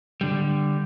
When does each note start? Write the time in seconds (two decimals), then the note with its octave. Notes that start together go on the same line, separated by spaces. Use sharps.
0.21 D3 G3